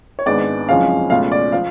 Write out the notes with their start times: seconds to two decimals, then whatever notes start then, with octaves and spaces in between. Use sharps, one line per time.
0.19 C#5
0.26 G#1 G#2 G#3 B3 D4 D5
0.69 F#1 F2 F3 G#3 C#4 F5
1.10 C#2 B2 A3 C#4 F4 F5
1.32 D5
1.52 F3 F5